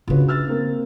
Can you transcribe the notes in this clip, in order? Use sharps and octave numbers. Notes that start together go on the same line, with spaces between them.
C#3 D4 F4 F#4 B4
E6 F6 A6
A#3 C4